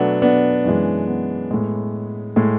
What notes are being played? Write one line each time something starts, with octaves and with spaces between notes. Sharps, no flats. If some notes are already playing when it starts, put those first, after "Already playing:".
Already playing: B2 F#3 A3 B3 D4
B3 D4
F#2 E3 G#3
B3
A2 G#3
A2 G#3